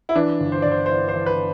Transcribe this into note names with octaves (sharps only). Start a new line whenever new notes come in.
E4
E3 D4
G1
C5
G1 D5
C5
C5
E3 D5
C5
E3
B4